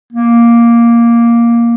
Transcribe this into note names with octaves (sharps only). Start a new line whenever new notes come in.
A#3